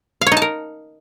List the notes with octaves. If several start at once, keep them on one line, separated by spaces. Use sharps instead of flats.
F5
C#5
D#4
A5
A#4